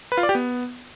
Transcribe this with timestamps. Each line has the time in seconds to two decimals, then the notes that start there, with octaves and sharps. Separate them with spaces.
0.12 B4
0.17 F4
0.23 D5
0.29 G4
0.35 B3